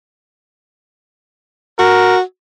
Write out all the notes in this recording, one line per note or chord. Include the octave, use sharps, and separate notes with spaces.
F#4 A#4